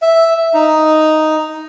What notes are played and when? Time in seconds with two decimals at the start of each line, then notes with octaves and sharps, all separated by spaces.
0.02 E5
0.54 D#4